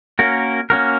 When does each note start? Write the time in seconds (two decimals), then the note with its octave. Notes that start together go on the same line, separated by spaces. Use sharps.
0.19 A#3 C#4 F#4 A#4
0.70 A#3 C#4 F#4 A#4